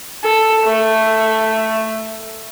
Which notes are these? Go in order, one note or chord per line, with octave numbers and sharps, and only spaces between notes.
A4
A3